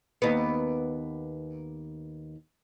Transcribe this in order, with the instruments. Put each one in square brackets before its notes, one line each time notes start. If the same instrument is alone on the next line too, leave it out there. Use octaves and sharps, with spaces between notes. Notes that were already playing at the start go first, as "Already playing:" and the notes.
[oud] D#2 B3